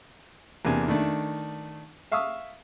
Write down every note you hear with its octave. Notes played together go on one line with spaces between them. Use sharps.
E2 C3 A#3 D4 G#5
D#3 A3 D4
E5 F5 C#6 D#6 E6